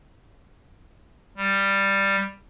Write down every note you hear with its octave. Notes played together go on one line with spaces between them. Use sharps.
G3